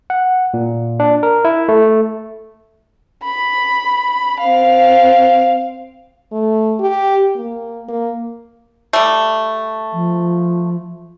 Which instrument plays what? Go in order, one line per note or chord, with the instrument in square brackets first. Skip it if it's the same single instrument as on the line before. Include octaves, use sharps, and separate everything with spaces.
[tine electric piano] F#5
A#2
D4
A#4
E4
A3
[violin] B5
C4 F5
[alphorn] A3
G4
A#3
A#3
[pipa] G3 A3
[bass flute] F3